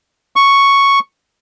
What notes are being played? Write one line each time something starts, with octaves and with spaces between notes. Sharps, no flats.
C#6